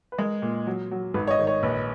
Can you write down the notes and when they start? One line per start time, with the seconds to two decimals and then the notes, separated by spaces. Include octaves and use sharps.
0.12 B4
0.18 G#3 A#4
0.42 A#2
0.67 F#3
0.91 F#3
1.14 G#1 B4
1.27 C#5
1.31 D#5
1.39 D#3
1.47 C#5
1.63 A#1 B4